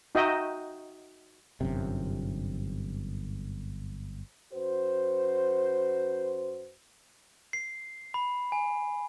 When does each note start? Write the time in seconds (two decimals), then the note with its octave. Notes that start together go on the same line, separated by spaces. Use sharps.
0.15 D#4 F#4 D#5 E5 G5
1.61 G1 F#2 C3
4.53 F#2 F#4 B4 C5
7.53 C7
8.14 B5
8.52 G#5